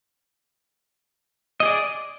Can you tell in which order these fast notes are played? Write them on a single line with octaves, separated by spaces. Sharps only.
D#5 G#4 D5